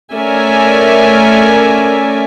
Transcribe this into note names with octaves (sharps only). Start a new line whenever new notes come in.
A3 C#4 A#4 D5 E5 G#5